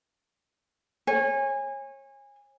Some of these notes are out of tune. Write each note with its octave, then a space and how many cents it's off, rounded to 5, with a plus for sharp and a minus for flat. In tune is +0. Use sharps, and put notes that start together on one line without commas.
C#5 -30 G#5 -20